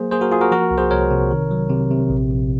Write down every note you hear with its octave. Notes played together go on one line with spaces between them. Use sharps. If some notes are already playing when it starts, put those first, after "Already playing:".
Already playing: F#3 A#3 G#4 C5
A#3 G#4 C5
F#4 A#4
A#3 F4 G#4
F#4 A#4
F3 F#4 A#4
C2
G#4 C5
C2 A#4 C#5
C3
D#3
F#3
C3
C3
A#1
A#1